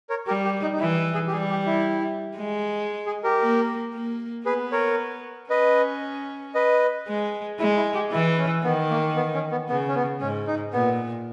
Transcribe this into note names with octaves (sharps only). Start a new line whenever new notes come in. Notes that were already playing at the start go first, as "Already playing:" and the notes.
A#4 C#5
G3 G4 A#4
G4
D#4
D#4
E3 E4
G#4
G4
G3 G#4
G4
E4
G#3
G#4
G4 A#4
A#3
A#3
B3 G#4 B4
A#4 C#5
C#4 B4 D#5
B4 D#5
G#3
G#3 E4
E4
G4
E3 E4
C#4
D#3 B3
A#3
B3
C#4
B3
C#3 B3
C#4
B3
G#2 C#4
D#4
A#2 B3